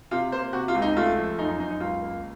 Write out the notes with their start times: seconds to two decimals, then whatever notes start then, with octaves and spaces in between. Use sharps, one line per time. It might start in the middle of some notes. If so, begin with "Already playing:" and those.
0.11 C3 F4
0.32 A#3 C5
0.53 C3 F#4
0.68 F4
0.75 C#2
0.82 D#4
0.97 A3 F4
1.17 F3
1.38 F#2 D#4
1.49 D#4
1.60 F#2 D#4
1.71 D#4
1.80 C#2 F4
2.02 A#3